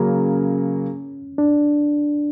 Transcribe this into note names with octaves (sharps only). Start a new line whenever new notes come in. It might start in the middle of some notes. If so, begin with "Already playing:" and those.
Already playing: C#3 F#3 A#3 C#4
D4